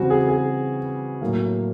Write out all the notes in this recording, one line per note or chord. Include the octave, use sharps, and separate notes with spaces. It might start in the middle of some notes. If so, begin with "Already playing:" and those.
Already playing: C#3 E3 G3 C4 F#4
G#4
G#4
A2 F#3 A#3